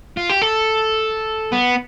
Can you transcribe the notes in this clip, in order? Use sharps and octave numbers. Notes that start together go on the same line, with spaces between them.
F4
G4
A4
B3